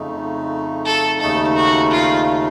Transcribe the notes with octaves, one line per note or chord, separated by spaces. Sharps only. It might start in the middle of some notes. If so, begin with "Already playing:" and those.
Already playing: F2 C#3 A3 D#4
A4
D#2 C#3 A3 D#4 A4
F#4
F4